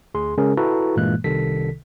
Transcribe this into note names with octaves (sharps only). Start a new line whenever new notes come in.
D2 G#4 C6
C#3 G#3 C#4 G#4 A#4
E4 F#4 A4 B4 A#5 C#6
G2 A#2 E3 G#3 A#3 F#6
C2 C3 D#3 A4 B6